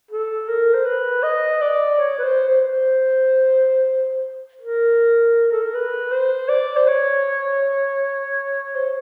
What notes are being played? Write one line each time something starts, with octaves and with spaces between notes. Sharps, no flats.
A4
A#4
C5
B4
D#5
D5
C#5
B4
C5
C5
A#4
A4
A#4
B4
C5
D5
C5
C#5
C5